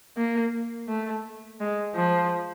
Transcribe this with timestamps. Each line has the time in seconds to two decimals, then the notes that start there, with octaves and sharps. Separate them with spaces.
0.17 A#3
0.88 A3
1.60 G#3
1.95 F3